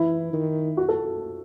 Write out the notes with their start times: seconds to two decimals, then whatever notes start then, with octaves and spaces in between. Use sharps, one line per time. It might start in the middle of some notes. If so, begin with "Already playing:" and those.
Already playing: E3 E4
0.33 D#3
0.77 F#4
0.89 A4